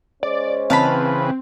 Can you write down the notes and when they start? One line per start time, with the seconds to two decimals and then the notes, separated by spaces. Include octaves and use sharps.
0.23 G#3 C#4 C5 D5
0.70 C#3 E3 C4 B4 F5 A5 B5